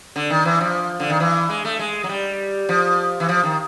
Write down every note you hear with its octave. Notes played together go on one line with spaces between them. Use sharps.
D3
D#3
E3
F3
D3
D#3
E3
G#3
A3
G#3
F#3
G3
F3
E3
F3
D#3